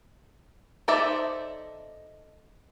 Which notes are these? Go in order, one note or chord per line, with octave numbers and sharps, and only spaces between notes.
D#4 A4 C5 D5 E5